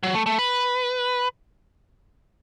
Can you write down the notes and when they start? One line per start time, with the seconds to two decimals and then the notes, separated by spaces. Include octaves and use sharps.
0.03 F#3
0.14 A3
0.26 A3
0.39 B4